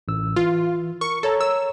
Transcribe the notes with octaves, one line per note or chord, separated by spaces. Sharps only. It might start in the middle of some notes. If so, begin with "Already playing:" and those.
A1 E6
E3 F4
A#4 C#6
A4 A#4 C#5 A#5
E6